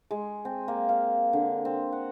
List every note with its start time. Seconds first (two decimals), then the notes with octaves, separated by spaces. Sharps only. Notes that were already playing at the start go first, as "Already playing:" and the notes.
0.11 G#3
0.45 C4
0.68 A#3
0.89 F5
1.33 D3
1.65 C4
1.92 F#5